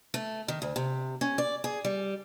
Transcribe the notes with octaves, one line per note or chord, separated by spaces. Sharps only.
A3
D#3
D2
C3
C#4
D5
G#4
G3